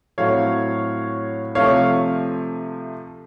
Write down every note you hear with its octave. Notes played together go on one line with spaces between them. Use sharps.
A2 F#3 C4 C#5 F5
C3 F3 A3 C#5 F5